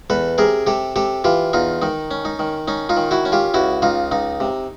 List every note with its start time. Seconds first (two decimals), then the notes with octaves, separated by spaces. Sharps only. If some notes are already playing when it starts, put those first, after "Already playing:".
0.10 E2 A4 B4
0.38 C3 G#4 A#4
0.67 C3 G4 A4
0.96 C3 G4 A4
1.24 E3 F4 G4
1.53 E2 D#4 F4
1.82 D#3 D#4
2.11 C#4
2.25 D#4
2.39 D#3
2.68 C#4 D#4
2.89 D#4 F4
2.97 D#3
3.11 E4 F#4
3.25 C#4
3.32 F4 G4
3.54 C#2 E4 F#4
3.82 C#2 D#4 F4
4.11 C#2 D#4
4.40 C3